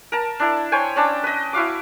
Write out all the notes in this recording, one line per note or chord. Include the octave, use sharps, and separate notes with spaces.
A#4 A5
D4 E4 A5
C5 C#5 G5 G#5
C#4 D4 A5 D6
B4 D#5
E4 F#4 F5 D6